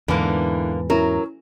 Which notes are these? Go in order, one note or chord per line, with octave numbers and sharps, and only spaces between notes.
E2 G#2 D3 E3 A#3 B5
F#3 C#4 E4 A#4